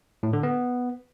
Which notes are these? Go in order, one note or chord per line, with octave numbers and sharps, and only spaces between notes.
A2
D3
B3